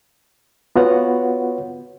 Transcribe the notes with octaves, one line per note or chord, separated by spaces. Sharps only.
B3 F4 F#4 B4 C#5 F#5